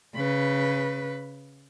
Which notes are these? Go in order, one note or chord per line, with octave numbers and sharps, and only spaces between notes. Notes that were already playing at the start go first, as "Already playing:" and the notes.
C#3 B4